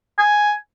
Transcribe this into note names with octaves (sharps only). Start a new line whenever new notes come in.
G#5